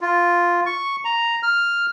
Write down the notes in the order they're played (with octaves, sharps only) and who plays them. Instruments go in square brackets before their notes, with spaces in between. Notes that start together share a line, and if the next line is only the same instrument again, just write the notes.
[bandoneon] F4
C#6
A#5
F6